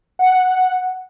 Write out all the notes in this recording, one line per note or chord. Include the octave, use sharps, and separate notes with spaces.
F#5